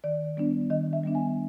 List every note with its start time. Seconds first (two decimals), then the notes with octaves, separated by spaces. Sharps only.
0.04 D#3 D5
0.37 G3 B3 D4
0.70 D#3 D#5
0.93 E5
1.04 G3 B3 D4
1.15 G#5